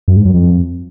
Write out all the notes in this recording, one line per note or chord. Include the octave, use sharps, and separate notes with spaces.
F#2
G#2
F#2
F2